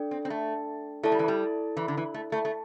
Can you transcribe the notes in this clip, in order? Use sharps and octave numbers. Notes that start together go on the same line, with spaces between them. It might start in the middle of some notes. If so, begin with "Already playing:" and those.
Already playing: D4 A4 D5 G5
C4
C4
A3
A3 E4 A4 D5 A5
G3
E3
G3
E3
D3
E3
A3
A3
A3